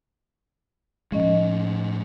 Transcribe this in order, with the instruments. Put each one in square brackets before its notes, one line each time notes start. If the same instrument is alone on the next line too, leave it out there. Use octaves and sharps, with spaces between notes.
[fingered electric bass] A2 G#3 [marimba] F3 C#4 D#5